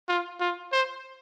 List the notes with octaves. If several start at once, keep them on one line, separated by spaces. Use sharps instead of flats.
F4
F4
C5